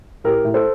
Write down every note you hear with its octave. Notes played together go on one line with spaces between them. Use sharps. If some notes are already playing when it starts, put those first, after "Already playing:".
A2 G4 A#4
A2
A4 C5